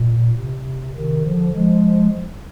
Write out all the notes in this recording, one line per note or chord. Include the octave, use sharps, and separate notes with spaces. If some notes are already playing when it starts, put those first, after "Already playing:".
Already playing: A#2
C3
C3 D#3
D3 F3
F3 G#3